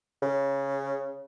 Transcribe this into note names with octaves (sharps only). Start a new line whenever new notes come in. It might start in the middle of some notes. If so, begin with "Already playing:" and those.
C#3